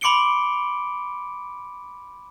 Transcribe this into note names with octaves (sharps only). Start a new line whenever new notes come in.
B5 C6 D6 C#7 D7 G7